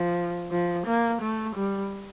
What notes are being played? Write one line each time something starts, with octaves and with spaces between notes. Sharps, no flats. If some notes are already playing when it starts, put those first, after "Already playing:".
Already playing: F3
F3
A#3
A3
G3